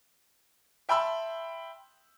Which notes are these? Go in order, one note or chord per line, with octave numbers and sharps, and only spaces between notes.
E5 G5 A5 B5 C6 E6